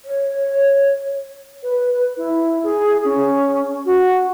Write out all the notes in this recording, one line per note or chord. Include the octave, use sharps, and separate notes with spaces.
C#5
B4
E4
G#4
C#4
F#4